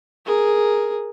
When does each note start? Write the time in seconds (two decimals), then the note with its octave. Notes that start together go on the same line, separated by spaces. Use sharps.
0.26 G#4 A#4